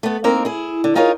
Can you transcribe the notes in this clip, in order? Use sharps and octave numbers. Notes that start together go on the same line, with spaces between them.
A3 B3
A#3 C4 D#4 A#4
E4 G#4
D3
D#4 F4 G#4 A#4 C#5